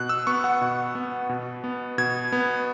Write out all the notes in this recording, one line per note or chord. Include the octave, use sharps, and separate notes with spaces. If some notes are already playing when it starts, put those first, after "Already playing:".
Already playing: B2 F#6
E6
B3 C#6
F#5
B2
B3
B2
B3
B2 G#6
B3